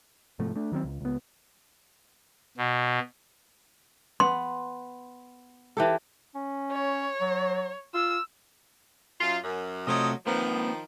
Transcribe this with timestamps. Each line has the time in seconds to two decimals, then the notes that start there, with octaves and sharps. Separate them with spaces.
0.39 G#2 C3 F3 A3
0.56 A3 D4
0.72 D#3 F#3 G3 C4
0.84 C#2
1.01 C#2 B3
2.57 B2
4.20 B3 C6
5.77 E3 G4 A4
6.35 C#4
6.72 C#5
7.21 F#3
7.94 F4 E6
9.21 F#2 F4
9.44 F#2
9.87 C3 F3 F#3 A3 D#5
10.27 D#3 F3 A#3 C4 B4